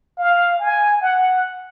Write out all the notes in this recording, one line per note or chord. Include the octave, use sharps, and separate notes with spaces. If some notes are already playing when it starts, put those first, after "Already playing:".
F5
G#5
F#5